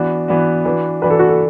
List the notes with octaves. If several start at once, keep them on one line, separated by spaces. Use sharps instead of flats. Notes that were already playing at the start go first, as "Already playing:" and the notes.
Already playing: E3 B3 D4 F#4
E3 B3 D4 F#4
E3 D4 F#4 B4
E3 D4 F#4 B4
A4
F#4
A4